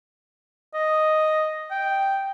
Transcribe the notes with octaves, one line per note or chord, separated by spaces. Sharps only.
D#5
G5